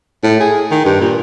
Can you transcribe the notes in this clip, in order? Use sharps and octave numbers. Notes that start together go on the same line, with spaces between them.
A2
G#4
D#3
G2
A#2